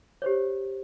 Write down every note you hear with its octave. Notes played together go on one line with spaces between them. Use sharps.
G4 C5 C#5